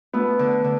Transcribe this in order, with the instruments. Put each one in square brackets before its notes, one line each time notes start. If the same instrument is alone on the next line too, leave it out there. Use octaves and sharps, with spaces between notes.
[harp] A3 [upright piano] B3
[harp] D3
D3